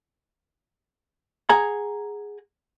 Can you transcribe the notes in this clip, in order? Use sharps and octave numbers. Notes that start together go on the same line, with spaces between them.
G#4 F#5 G#5 A#5